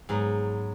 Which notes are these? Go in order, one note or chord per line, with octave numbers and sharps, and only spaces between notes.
G#2 F#3 B3